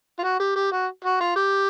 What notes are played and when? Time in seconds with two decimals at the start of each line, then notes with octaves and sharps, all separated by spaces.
0.19 F4
0.23 F#4
0.40 G4
0.55 G4
0.72 F#4
1.04 F#4
1.21 F4
1.36 G4